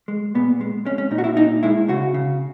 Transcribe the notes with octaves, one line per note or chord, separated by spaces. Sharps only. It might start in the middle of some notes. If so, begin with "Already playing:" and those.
G#3
A#2 B3
G#3
G#3 C#4
C#4
A#2 D#4
F#4
E4
A#2 D#4
G#3 E4
C#3 F#4
C#3